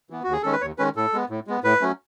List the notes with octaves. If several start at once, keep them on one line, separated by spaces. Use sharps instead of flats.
E3 B3
D#2 F#4
G#4
D#3 G#3 C#4 A4
B4
D#2 C#5
D#3 G#3 C#4 B4
A2 A4
G#3 B3
A2
G#3 B3
A2 B4
F#3 A3 C#4